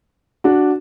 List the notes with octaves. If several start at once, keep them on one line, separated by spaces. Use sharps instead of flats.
D4 F#4